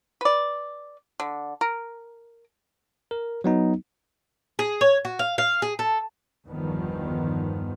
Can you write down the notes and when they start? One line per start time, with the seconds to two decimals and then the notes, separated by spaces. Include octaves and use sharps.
0.21 B4 D5
1.20 D3
1.61 A#4
3.11 A#4
3.44 F#3 B3 D#4
4.59 G#4
4.81 C#5
5.05 F#4
5.19 F5
5.38 F5
5.62 G#4
5.79 A4
6.47 G1 E2 G2 D#3 F3 B3